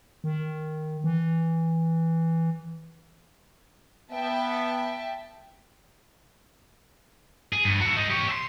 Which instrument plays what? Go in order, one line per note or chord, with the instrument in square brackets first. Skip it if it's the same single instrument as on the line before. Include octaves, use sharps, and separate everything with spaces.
[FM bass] D#3
E3
[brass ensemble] B3 [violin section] E5 G5 A5
[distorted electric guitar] G#4
G2
F#4 A4
G#3 D#4
G4 C#5
E5 C6